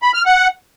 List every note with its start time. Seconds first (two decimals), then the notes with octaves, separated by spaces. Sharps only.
0.02 B5
0.14 F6
0.26 F#5